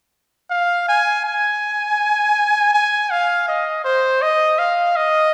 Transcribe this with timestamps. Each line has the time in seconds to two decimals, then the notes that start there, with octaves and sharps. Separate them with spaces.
0.51 F5
0.89 G#5
1.25 G#5
2.74 G#5
3.11 F5
3.48 D#5
3.85 C5
4.22 D#5
4.59 F5
4.96 D#5